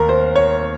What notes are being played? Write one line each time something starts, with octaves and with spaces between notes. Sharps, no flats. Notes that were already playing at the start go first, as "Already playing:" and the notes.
Already playing: D#2 A#4 A#5
C5
C#5